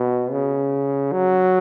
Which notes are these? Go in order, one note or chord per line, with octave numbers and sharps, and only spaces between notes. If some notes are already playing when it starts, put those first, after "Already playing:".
Already playing: B2
C#3
F#3